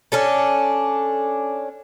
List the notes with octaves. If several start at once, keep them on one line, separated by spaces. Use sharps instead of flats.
C#4 D4 A4